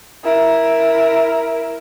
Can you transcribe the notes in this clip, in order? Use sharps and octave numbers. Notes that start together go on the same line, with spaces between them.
E4 A#4